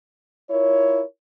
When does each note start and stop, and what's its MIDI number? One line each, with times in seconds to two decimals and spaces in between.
0.50 1.02 64
0.50 1.02 65
0.50 1.02 70
0.50 1.02 73